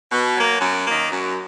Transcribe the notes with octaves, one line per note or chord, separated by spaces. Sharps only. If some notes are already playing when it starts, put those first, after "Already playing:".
B2
F#3 A#3
F#2
D#3 A#3
F#2